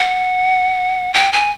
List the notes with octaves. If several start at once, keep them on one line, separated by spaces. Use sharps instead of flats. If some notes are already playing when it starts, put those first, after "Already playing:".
Already playing: F#5
G5
G#5